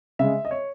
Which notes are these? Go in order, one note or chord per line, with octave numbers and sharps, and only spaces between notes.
C#3 G#3 E5
D#5
C#5